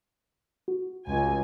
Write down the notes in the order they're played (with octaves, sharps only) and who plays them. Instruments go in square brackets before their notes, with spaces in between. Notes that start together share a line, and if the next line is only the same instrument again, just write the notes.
[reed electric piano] F#4
[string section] C#2 G#5